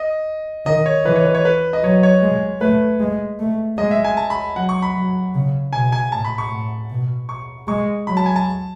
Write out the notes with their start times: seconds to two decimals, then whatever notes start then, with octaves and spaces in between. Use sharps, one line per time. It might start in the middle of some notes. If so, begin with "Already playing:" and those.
Already playing: D#5
0.66 D#3 D#5
0.86 C#5
1.05 E3 B4
1.16 C#5
1.25 B4
1.35 C#5
1.45 B4
1.73 D#5
1.83 F#3 C#5
2.03 C#5
2.22 G#3
2.61 A3 B4
3.00 G#3
3.39 A3
3.78 G#3 D#5
3.91 E5
4.04 G#5
4.17 A5
4.30 B5
4.56 F#3 F#5
4.69 C#6
4.82 B5
4.95 F#3
5.35 C#3
5.73 B2 G#5
5.92 G#5
6.12 A2 A5
6.25 B5
6.38 C#6
6.51 A2
6.90 B2
7.29 C#6
7.68 G#3 C#6
8.07 F#3 B5
8.17 A5
8.26 G#5
8.36 A5